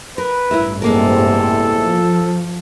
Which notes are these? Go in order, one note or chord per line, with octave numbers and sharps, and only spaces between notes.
A#4 B4
A1 G2 E4 A#4 E5
E2 A2 C3 G#3 A#3 A4 A#4
F3